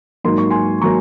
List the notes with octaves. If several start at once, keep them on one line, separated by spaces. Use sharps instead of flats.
G#2 F#3 A#3 D#4 C6
C#6
G#5 C6
F#3 A#3 A#5 C#6